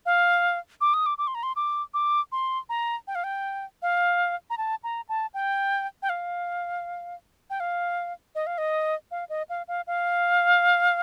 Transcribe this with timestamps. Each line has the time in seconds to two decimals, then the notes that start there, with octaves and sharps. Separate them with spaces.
0.06 F5
0.81 D6
0.94 D#6
1.06 D6
1.18 D6
1.27 C6
1.35 A#5
1.43 C6
1.56 D6
1.94 D6
2.32 C6
2.69 A#5
3.07 G5
3.15 F5
3.24 G5
3.82 F5
4.50 A#5
4.58 A5
4.84 A#5
5.09 A5
5.34 G5
6.02 G5
6.09 F5
7.50 G5
7.60 F5
8.35 D#5
8.47 F5
8.58 D#5
9.11 F5
9.29 D#5
9.49 F5
9.68 F5
9.87 F5